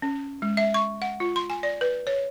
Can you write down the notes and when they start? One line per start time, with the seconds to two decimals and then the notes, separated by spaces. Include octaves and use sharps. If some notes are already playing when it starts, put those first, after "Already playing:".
0.02 C#4
0.42 G#3
0.57 E5
0.74 C#6
1.02 F#5
1.20 F4
1.36 C6
1.50 G#5
1.63 D5
1.81 B4
2.07 C#5